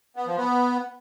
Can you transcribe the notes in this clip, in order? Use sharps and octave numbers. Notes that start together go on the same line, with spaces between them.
B3
F3
B3